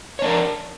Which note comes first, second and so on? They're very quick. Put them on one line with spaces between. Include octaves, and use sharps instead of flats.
C#5 D4 A#4